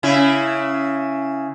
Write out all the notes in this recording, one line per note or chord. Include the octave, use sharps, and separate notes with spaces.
C#3 E4